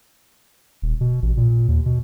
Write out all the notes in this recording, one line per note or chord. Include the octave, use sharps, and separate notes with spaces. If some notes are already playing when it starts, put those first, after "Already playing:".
D#1
B2
A1
A#2
D#2
B2